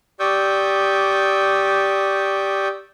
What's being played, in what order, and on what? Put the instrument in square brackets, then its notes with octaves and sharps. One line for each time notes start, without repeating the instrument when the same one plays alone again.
[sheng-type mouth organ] G4 D5 C#6 D#6 E6 G6